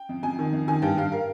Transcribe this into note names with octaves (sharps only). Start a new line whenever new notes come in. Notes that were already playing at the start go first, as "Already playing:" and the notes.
Already playing: G5
F2
F2 G#5
D#3
F2
D#3 G#5
G2 G5
G2 F5
A#4